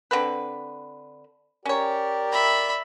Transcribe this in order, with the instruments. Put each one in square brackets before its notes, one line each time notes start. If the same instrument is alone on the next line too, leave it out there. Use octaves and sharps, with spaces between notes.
[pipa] D3 C4 B4
[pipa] C#4 C#5 [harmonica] G4 A#4 D5
[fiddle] E5 B5